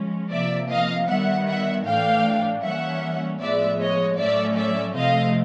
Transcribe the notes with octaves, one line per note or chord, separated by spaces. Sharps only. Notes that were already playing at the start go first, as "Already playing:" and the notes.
Already playing: F3 G#3 C#4
C3 F3 A#3 D5 E5
D#5 F5
D#3 G3 B3 E5 F#5
E5 F#5
A2 E3 A3 D4 F5 G5
E3 G3 A#3 C#4 E5 F#5
A2 F3 G#3 B3 D5 E5
C#5 D#5
A2 F#3 A3 C#4 D5 E5
D5 E5
C3 F3 A3 C4 D#5 F5